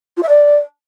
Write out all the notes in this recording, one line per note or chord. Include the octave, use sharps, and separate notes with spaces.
F4
E5
D5